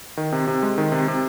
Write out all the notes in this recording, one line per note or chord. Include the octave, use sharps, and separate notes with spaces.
D#3
C3
C3
G#3
D#3
C3
C3